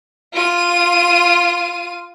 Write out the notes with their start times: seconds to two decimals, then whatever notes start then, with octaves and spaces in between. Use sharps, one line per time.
0.33 F4 D#7